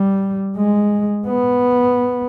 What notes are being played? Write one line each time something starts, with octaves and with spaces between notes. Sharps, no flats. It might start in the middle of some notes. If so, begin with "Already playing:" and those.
Already playing: G3
G#3
B3